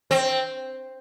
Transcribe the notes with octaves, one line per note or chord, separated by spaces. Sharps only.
C4